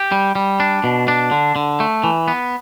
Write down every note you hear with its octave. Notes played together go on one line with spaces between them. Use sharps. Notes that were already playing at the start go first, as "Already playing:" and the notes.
Already playing: G4
G3
G3
D4
B2
D4
D3
D3
A3
E3
B3